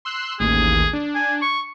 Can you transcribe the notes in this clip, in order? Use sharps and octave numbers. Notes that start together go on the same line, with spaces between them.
C6 E6 F#6
A1 D#2 G#4
D4
G#5
C#6